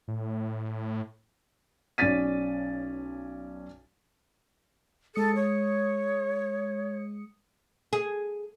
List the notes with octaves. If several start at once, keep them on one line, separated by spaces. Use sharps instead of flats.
A2
B1 C#4 D5 A6 B6 D#7
G#3 A4 D#6 C#7
C#5
G#4